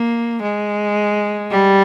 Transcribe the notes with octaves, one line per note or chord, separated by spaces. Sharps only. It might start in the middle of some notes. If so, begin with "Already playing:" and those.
Already playing: A#3
G#3
G3